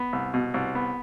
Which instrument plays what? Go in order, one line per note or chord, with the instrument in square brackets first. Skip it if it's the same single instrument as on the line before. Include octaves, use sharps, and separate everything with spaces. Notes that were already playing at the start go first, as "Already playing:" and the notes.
Already playing: [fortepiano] B3
C2
B2
C2
B3